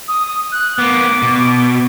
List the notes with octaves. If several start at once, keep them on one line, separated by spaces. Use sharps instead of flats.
D#6
F#6
A#3 B3 D6
B2